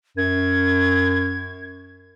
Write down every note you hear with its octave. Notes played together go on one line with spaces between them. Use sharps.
F#2 G#6